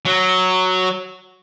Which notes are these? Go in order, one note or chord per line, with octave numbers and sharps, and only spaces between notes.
F#3